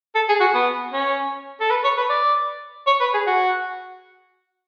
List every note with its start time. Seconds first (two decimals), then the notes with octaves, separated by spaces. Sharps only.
0.15 A4
0.29 G#4
0.41 F#4
0.55 B3
0.93 C#4
1.61 A4
1.70 B4
1.84 C#5
1.97 B4
2.09 D5
2.87 C#5
3.00 B4
3.14 G#4
3.27 F#4